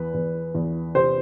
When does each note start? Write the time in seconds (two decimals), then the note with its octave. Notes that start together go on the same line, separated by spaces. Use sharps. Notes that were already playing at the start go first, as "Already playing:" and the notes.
Already playing: E2 B4
0.14 E2
0.54 E2
0.95 C3 C5